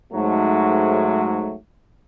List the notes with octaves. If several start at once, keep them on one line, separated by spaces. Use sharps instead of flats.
G#2 F#3 A3